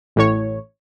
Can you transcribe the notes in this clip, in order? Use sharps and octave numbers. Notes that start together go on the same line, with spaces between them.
A1 A2 C#5